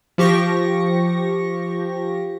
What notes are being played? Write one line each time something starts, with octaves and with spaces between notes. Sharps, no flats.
F3 G4 C#6 A#6